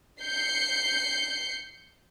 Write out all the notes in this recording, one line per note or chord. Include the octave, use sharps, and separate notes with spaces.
G6 C7 C#7